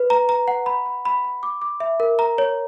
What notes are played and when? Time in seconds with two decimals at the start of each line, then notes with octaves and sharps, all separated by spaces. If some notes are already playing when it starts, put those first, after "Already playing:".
Already playing: B4
0.10 A#5
0.29 A#5
0.48 F#5
0.66 B5
0.86 B5
1.05 B5
1.24 B5
1.43 D6
1.62 D6
1.80 E5
2.00 A#4
2.19 A#5
2.38 C#5